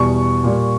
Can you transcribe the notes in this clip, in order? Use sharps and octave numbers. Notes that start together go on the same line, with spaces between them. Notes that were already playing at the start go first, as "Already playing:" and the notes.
Already playing: E2 B2 G3 C#6
A#2 G3